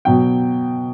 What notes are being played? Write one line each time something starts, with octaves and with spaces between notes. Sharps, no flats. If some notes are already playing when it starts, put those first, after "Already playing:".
B2 F#3 B3 G5